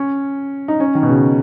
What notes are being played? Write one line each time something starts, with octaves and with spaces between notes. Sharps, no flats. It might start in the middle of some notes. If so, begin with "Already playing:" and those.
Already playing: C#4
D#4
C#4
D#3
B2
C#3